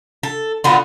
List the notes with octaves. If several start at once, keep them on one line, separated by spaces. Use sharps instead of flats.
A4
D3 B3 F4 F#4